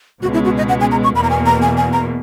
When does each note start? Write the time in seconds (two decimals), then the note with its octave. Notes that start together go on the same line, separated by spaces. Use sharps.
0.22 C#2 B2 G#3 F#4
0.34 E4
0.45 F#4
0.57 D#5
0.69 F#5
0.80 G#5
0.92 A#5
1.04 C#6
1.15 E2 B2 A#3 B5
1.23 A#5
1.30 G#5
1.46 A#5
1.62 G#5
1.77 G#5
1.93 A#5